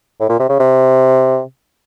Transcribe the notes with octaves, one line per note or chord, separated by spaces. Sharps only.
A2
A#2
C3
C#3
C3